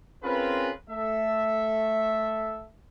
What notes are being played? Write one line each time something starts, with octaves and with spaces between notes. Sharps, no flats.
C4 C#4 F4 G#4 A#4 B4
A3 A4 E5